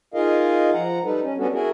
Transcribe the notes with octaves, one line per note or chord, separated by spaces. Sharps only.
D#4 F4 G#4 A#4 D#5 F5
F3 F#5 A#5
G3 D#4 A4 B4
C#4
G3 B3 C#4 D4 F#4 A4
E4 F#4 G#4 A#4